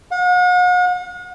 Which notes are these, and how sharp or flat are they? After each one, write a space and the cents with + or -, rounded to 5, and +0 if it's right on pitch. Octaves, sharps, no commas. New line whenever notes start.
F#5 -45